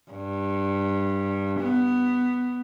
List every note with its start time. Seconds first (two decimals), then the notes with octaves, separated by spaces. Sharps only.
0.11 G2
1.59 B3